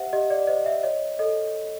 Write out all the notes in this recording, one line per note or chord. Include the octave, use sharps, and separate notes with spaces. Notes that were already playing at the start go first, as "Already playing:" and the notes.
Already playing: G4 C5 E5 F#5
G4 D#5
D5
C5 D#5
E5
C#5 D#5
A4 D#5